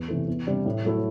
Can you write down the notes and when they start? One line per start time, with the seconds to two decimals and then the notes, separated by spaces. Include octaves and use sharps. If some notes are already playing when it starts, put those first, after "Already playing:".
Already playing: E2
0.08 C3 E3 A3
0.28 E2
0.46 C3 G3 D4
0.66 A2
0.85 F#3 A3 E4